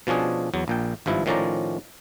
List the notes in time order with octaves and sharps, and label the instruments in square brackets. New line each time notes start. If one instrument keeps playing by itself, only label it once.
[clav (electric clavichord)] B2 F3 C#4 D4 G#4
E2 F#3
A#1 A#2 G5
G#1 G2 F3 E4
A2 D#3 F3 C#4 D5 A#5